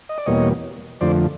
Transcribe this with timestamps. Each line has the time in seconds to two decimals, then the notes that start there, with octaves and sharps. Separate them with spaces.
0.09 D#5
0.18 D5
0.26 E2 B2 G3 A#3 C#5 D#5
1.01 F2 D3 F3 A3 C5 D5